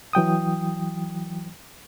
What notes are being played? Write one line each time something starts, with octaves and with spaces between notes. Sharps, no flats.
E3 F#3 G5 D#6